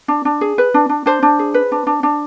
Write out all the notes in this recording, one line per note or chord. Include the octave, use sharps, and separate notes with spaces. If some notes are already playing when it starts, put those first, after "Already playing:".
D4
D4
G#4
B4
D4
D4
D4 C5
D4
G#4
B4
D4
D4
D4